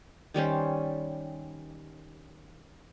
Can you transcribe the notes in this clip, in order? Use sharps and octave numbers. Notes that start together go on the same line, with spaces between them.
D#3 G3 C#4 C5